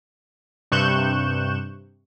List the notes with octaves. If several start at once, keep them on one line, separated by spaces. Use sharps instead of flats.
G2 C3 C#6 F#6 G6 E7